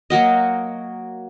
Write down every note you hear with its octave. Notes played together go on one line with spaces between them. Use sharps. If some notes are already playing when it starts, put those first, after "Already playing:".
F#3 A#3 F#4 D#5